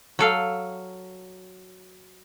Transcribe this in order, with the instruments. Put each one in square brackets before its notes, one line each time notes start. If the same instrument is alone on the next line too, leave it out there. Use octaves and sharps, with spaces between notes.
[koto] F#3 A4 F5